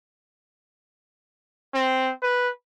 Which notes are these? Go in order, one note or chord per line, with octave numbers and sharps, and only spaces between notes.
C4
B4